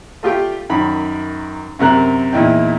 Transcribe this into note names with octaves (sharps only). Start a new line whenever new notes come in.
A3 F4 G4 G5
F#2 D#3 B5
F#2 C3 A#4 F#6
E2 A#2 D#4 E4 G5